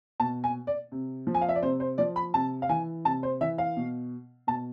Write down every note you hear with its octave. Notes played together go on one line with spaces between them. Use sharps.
B2 A5
G#5
D5
C3
F3
G#5
F5
E5
D5
C3 C5
C5
F3 D5
B5
C3 A5
F5
E3 G#5
C3 A5
C5
E3 E5
F5
B2
B2 A5